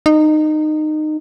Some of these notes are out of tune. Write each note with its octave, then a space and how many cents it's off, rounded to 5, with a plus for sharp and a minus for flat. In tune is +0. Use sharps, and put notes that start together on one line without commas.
D#4 -20